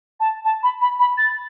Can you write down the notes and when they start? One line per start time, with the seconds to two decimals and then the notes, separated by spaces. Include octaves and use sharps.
0.20 A5
0.45 A5
0.63 B5
0.81 B5
0.99 B5
1.18 A6